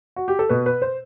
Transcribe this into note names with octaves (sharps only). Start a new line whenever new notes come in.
F#4
G4
A4
B2 B4
B4
C5